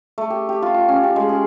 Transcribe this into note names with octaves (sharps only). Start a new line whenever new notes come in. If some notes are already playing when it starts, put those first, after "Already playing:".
A3
G4
G4
F4
F4
C#4
G4
G#3
G#4